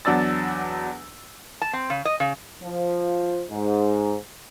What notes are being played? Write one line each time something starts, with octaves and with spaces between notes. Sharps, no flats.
E2 F#3 D4 E6 A6
A5
C4
C#3
D#5
C#3
F3
G#2